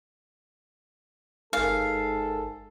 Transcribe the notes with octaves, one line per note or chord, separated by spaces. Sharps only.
G1 G#2 A4 A#4 F5 G#5